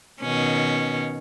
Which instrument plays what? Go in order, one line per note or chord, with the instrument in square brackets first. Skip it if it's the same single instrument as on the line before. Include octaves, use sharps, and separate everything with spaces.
[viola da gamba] B2 D#3 C#4